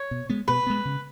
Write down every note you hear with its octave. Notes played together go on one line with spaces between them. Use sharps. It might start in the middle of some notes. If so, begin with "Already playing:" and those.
Already playing: C#5
B2
G#3 B3
B2 B4
G#3 B3
C#3